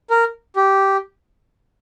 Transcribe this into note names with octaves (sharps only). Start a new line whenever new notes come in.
A#4
G4